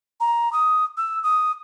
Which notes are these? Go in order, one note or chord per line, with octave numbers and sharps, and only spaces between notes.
A#5
D#6
E6
D#6